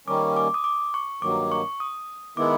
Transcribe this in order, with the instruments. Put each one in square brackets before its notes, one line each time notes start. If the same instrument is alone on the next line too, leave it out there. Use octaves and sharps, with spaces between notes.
[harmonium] D#3 G3 A#3 C#4 [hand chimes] D6
[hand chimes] D6
D#6
D6
C#6
[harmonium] G2 D#3 F#3 A#3 [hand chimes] D6
[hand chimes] C#6
D#6
[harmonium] D#3 G#3 B3 E4 [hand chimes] D6